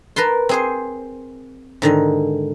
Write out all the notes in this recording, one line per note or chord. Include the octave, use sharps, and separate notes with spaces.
A#4 B4 A5 C6
C4 G#4 C5
G#2 D3 D#3